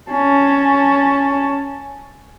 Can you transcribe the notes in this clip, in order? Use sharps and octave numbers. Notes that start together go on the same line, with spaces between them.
C#4 A5